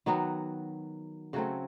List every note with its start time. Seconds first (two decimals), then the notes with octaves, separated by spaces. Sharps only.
0.06 D#3 F#3 B3 F#4
1.33 C#3 F#3 A3 C4 F#4